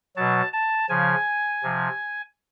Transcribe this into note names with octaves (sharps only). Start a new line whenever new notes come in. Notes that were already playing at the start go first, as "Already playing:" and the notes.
B2 F#3 A5
A5
C#3 F3 G#5
C3 F3